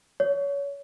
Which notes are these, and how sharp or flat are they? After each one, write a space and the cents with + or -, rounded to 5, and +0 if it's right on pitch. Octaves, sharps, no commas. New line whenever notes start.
C#5 +25